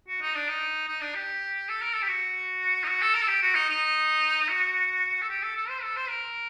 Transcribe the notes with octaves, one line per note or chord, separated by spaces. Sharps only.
F#4
D#4
D4
D#4
D#4
D4
G4
A4
A#4
A4
G4
F#4
D#4
F#4
A4
A#4
A4
G4
F#4
D#4
D#4
F#4
A4
G4
A4
A4
C5
A4
C5
A#4